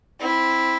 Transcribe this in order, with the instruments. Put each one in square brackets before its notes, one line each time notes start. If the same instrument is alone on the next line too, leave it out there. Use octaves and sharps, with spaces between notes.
[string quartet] C4 E4